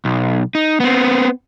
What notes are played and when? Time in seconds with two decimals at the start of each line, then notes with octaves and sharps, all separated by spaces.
0.05 B1
0.55 D#4
0.80 B3 C4